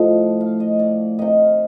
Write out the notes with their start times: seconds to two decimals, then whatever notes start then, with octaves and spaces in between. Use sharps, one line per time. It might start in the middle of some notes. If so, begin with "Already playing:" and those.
Already playing: A2 F3 D#5 F5
0.40 F5
0.60 D#5
0.79 D5
1.19 C3 D#3 D#5
1.38 F5